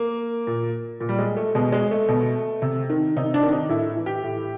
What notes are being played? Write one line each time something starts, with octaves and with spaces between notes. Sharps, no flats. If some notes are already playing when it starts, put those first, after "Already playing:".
Already playing: A#3
A#2
A#2
G3
G#3
A3
B2 G#3
G#3
A3
B2
C3
D#3
C3 D#4
D4
D#3
D#4
A2 E4
E3
G4
A2